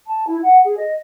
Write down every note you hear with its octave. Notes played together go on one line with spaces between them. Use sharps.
A5
E4
F#5
G#4
D#5